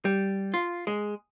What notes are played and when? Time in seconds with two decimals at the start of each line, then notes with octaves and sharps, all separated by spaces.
0.05 G3
0.54 F4
0.87 G#3